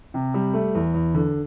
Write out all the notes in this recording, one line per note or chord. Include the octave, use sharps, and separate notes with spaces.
C3
G3
A3
E2
E2
D3